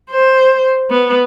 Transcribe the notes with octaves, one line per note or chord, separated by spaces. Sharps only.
C5
B3